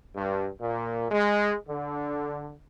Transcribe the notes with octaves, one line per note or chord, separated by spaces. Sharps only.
G2
A#2
G#3
D3